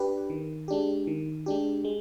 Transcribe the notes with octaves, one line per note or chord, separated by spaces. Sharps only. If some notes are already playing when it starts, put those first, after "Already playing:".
Already playing: D4 G4 B4
D#3
G#3 D4 G4
D#3
G#3 D4 G4
G#3